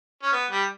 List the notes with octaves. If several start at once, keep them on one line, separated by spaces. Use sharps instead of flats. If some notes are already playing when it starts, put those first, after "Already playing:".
C#4
B3
G3